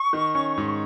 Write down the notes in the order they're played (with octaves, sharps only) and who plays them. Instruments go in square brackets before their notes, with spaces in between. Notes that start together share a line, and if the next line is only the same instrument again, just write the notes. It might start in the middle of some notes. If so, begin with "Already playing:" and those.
Already playing: [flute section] C#6
[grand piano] D#3
C#4
G#2